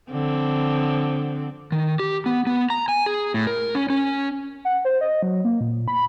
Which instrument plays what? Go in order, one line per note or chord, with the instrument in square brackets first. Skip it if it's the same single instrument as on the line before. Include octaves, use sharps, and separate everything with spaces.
[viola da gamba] D3 F3 C4
[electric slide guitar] D#3
G4
B3
B3
A#5
G#5
G#4
A2
A#4
C#4
C#4
[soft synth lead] F#5
C5
D#5
F#3
A#3
A#2
B5